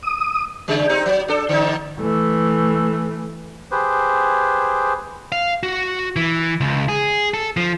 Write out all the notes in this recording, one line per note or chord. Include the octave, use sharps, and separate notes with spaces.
D#6
C#3 G3 G#3
C4 D#4 G4
F#3
D4 A4
D3 D#4
E3 A3
G4 G#4 B4 C5
F5
F#4
E3
C#2
G#4
A4
F3